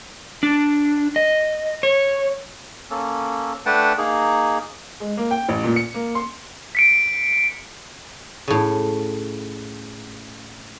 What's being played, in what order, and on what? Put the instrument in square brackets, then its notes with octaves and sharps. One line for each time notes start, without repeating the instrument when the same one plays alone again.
[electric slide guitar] D4
D#5
C#5
[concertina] A#3 C#4 A4
A3 D4 B4 F#5 G5 A5
A#3 D#4 G#4
[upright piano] G#3
A#3
G5
A1
A#2
C#7
A#3
C6
[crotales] B6 C#7 D7
[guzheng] A2 C#3